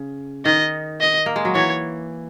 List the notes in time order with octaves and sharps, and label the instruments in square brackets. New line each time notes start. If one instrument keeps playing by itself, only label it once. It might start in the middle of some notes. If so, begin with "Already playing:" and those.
Already playing: [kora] C#3
[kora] D#3 [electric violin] D#5
[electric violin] D#5
[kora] A#3
G#3
F#3
[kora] E3 [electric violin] C#5